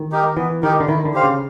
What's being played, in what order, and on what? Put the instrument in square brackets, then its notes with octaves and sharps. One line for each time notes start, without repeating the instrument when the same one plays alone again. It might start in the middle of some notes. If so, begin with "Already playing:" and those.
Already playing: [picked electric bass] D#3
[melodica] D#4 G4 A#4
[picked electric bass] E3 [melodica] B3
[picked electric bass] D#3 [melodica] D#4 G4 A#4
[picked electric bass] D3
[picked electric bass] D#3 [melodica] E4
[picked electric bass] D3
[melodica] G4 C5 F5
[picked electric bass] C#3